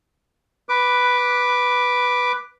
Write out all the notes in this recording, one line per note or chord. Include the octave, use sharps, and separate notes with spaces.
B4 D6